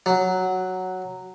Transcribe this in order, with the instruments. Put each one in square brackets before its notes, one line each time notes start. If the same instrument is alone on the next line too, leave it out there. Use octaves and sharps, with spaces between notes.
[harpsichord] F#3